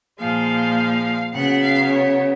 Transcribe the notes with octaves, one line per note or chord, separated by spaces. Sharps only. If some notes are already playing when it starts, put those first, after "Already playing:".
A#2 F3 G#3 F5
C#3 F#3 B3 F#5
F5
C#5